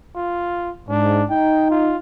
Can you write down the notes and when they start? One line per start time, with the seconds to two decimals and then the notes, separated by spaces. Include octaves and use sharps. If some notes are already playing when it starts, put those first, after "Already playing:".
0.15 F4
0.89 G#2 D4
1.30 D#4 G5
1.70 F4